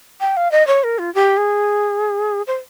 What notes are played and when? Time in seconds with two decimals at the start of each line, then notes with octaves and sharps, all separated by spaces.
0.21 G5
0.37 F5
0.52 D#5
0.67 C#5
0.84 A#4
0.99 F4
1.15 G4
1.37 G#4
2.47 C5